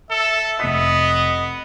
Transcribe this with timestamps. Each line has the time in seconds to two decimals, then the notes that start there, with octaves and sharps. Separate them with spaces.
0.10 A4 E5
0.60 F1 B3 D#5 B6